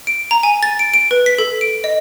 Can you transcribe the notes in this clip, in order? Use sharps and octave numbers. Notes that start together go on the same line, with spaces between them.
D7
A#5
G#5
A6
D7
D7
B4
B6
A4
D7
D#5